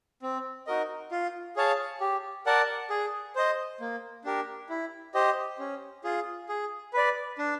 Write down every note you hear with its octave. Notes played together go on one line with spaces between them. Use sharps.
C4
D#4 F#4 A#4 D#5
F4
G#4 C#5 F5 A5
G4
A#4 D5 F#5 A5
G#4
C5 D#5
A#3
D4 G4 A#4
E4
G4 C5 D#5
C#4
F4 G#4
G#4
B4 D5
D4